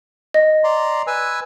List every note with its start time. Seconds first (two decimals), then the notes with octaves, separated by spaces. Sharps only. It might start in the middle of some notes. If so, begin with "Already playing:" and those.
0.34 D#5
0.64 D5 A#5 C6
1.07 B4 G#5 E6